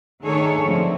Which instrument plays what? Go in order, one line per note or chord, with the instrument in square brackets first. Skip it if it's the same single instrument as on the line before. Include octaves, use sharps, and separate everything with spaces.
[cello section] D#3 A3 D4 G#4 A4 C#5
D3 F3 F#3 A3 C4